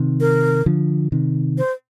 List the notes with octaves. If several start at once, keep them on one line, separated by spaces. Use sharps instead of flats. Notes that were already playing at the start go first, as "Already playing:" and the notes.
Already playing: C3 D#3
A#4
D3 F3
C3 D#3
C5